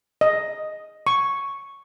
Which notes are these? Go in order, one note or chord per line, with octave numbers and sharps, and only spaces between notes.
D#5
C#6